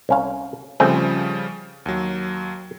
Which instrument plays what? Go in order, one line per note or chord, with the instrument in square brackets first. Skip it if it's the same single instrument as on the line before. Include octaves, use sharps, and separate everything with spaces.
[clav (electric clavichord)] C2 C#4 F5
[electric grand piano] C#3 F3 G3 [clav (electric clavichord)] A3 C4 G#4
[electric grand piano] D#2 F#3